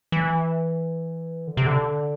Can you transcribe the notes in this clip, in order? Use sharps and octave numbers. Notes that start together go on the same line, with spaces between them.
E3
D3
C3
D3